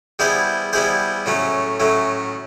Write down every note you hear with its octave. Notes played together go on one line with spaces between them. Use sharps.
G3 B3 E4 G#4 C5
G3 B3 E4 G#4 C5
A2 F#3 A3 C#4
A2 F#3 A3 C#4